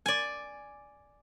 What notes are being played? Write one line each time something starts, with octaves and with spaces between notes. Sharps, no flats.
D5 G#5